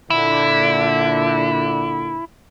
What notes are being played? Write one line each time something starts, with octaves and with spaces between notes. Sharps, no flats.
A#2 D3 E4